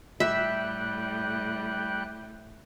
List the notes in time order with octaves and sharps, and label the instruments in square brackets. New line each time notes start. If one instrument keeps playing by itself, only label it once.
[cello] A2 [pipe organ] G3 G5 F#6 [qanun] E5